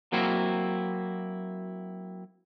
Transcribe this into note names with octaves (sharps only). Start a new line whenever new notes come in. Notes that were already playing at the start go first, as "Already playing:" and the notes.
F#3 A#3 C4 E4 F#4